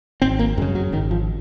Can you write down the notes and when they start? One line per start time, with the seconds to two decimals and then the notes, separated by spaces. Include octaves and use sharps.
0.22 G#1 C4
0.39 A#3
0.57 F#2 G#3
0.61 C#3
0.75 F#3
0.92 G#1 D#3
1.11 F3